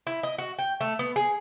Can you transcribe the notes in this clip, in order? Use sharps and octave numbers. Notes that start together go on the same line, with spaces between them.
E4
D#5
F#4
G5
A3
B3
G#4